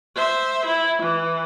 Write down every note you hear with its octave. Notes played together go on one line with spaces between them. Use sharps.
C5 E5
E4
E3